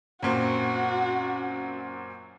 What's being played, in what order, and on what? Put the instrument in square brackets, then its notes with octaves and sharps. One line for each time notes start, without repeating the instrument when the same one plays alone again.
[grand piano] F#2 A#2 C4 [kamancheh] F#4